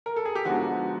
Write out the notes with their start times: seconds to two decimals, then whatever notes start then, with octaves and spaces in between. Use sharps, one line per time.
0.06 A#4
0.16 A4
0.25 G#4
0.35 G4
0.45 D3 F3 G#3 B3 D#4 F#4